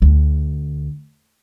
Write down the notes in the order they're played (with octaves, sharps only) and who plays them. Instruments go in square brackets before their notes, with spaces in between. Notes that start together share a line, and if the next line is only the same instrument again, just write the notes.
[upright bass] D2